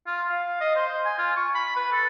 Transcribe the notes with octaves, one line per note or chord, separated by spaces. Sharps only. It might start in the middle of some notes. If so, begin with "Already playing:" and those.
F4
F5
D#5
C5
G#5
F4
C#6
B5
B4
A4